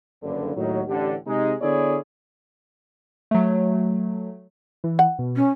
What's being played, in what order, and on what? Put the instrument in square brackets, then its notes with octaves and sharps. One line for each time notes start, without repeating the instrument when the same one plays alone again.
[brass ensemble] F#1 G2 D3
D#2 A2 D#3 F#3
A1 D3 G4
C3 G#3 D#4
D3 B3 E4 G#4 C#5 D5
[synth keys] F#3 A3
E3
[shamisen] F#5
[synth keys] B2
[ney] C#4